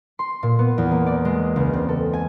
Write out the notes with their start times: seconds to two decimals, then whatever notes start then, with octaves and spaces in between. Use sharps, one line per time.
0.19 C6
0.43 A#2
0.59 B3
0.78 E2
0.91 A#3
1.06 D5
1.25 G#3
1.56 C#2
1.73 C4
1.89 A4
2.13 G#5